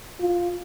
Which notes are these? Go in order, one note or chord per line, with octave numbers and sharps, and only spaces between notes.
F4